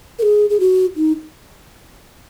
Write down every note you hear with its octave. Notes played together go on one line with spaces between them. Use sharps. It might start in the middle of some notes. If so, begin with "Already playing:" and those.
A#4
G#4
G#4
F#4
D#4